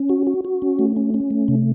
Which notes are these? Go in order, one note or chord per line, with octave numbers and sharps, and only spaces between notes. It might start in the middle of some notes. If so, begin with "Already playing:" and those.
Already playing: C#4
F#4
F#4
F#4
C#4
A3
C#4
C#4
A3
C3